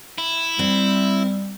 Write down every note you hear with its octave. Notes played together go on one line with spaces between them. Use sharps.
E4
G3 C4